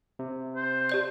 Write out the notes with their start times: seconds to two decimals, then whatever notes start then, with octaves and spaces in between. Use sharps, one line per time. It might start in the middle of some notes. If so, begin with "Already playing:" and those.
0.19 C3
0.55 C5
0.89 G4 D5 G6